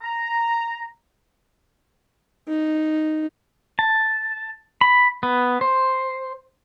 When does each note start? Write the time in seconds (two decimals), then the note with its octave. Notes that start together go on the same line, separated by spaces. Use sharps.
0.02 A#5
2.48 D#4
3.79 A5
4.81 B5
5.23 B3
5.61 C5